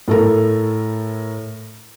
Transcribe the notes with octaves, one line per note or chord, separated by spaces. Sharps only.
A2 A4 A#4